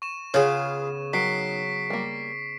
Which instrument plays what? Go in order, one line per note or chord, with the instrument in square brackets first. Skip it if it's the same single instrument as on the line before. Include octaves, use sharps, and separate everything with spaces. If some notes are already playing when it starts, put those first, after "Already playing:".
[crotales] C#6 E7
[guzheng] C#3 B3 [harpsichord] F4 G#4 [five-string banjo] C#5
[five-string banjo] D#3 [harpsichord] F#3 [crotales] B6 C7 D7
[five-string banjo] G3 A#3